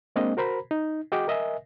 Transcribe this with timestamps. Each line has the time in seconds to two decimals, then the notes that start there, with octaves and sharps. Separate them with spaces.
0.16 G#3 A#3 C4 D4 D#5
0.37 F#4 A#4 C5 A#5 B5
0.71 D#4
1.12 F#4 G#4 D#5 G5 D6
1.28 A#4 D#5 E5 G#5